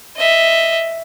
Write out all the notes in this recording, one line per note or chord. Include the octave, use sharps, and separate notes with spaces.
D#5 E5